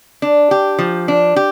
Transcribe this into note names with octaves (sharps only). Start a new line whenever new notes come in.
D4
G4
F3
D4
G4